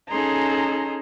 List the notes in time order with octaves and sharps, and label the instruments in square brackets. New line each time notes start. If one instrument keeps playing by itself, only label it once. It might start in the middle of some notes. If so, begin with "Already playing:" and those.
[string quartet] C#4 D#4 G#4 A4 A#5 C6